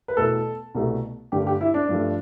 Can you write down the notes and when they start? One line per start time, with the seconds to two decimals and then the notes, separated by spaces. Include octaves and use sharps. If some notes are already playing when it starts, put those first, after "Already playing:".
0.08 B4
0.17 E2 B2 A3 A4
0.75 C2 B2 A3
1.32 G2 D3 A3 G4
1.47 G4
1.61 E4
1.74 D4
1.89 G2 F3 A3